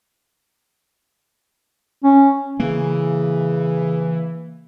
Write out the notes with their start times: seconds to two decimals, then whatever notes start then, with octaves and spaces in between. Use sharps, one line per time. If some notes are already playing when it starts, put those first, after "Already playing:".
2.04 C#4
2.60 C#3 E3 A#3